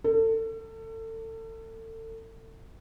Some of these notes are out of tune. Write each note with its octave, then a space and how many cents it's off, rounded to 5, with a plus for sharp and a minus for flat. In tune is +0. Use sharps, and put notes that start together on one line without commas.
A4 +30